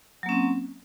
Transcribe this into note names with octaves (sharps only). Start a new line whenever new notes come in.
F#3 A#3 C4 C#4